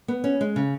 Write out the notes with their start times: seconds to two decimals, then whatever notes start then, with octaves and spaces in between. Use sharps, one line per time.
0.08 B3
0.24 C#4
0.41 G#3
0.56 C#3